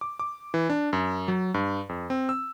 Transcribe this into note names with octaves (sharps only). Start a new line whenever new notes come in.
D6
D6
E3
D4
F#2
F#3
G2
F2
C4
E6